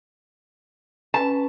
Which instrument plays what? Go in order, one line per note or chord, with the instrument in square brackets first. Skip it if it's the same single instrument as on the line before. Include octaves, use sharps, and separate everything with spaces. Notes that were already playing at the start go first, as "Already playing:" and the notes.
[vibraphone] C#4 B4 G#5 [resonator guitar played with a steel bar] A5